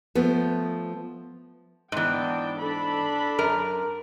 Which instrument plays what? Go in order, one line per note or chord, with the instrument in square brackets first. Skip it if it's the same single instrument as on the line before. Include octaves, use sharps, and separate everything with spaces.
[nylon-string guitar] F3 A3 B3
[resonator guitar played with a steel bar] G#2 E3 [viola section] B3 D4 G5
[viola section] D4 A4 B5
[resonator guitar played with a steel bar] F#2 A#4